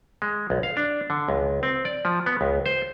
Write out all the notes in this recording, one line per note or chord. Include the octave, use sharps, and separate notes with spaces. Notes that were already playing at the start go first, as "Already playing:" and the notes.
G#3
B1
F5
D4
D3
C#2
C4
D5
F3
B3
C#2
C5